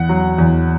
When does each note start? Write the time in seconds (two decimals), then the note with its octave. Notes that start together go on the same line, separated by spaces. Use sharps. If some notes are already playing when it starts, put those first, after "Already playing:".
Already playing: E2 F#5
0.09 F#3
0.38 E2